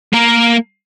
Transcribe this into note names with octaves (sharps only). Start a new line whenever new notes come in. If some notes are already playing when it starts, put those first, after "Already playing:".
A#3 A#4